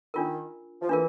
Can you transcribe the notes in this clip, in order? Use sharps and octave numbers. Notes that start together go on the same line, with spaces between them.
D#3 D4 F4 A#4
F3
E3 D4 F4 A#4